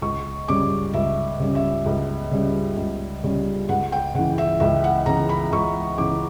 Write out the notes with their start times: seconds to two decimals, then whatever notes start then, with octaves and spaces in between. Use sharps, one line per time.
0.02 C#2 C#6
0.48 C#3 G3 C#4 D6
0.94 C#2 E5
1.40 C#3 G3 C#4
1.55 E5
1.86 C#2
2.32 C#3 G3 C#4
2.77 C#2
3.23 C#3 G3 C#4
3.69 C#2 F#5
3.92 G5
4.15 C#3 F#5
4.19 E3
4.38 E5
4.60 C#2 E5
4.84 F#5
5.06 C#3 E3 A#5
5.29 B5
5.52 C#2 C#6
5.98 C#3 E3 D6